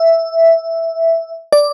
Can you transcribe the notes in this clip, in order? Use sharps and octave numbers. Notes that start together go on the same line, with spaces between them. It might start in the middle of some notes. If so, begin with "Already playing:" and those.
Already playing: E5
D5